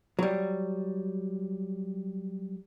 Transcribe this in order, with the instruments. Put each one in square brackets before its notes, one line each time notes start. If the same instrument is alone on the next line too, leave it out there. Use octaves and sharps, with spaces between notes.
[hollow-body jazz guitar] F#3 G3